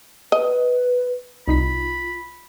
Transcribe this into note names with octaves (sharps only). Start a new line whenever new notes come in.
B4 D#5
C2 D#4 F4 B5 B6